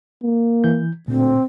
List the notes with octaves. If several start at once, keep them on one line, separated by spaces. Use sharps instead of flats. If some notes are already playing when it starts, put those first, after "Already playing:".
A#3
E3 G6
D2 A#2 C4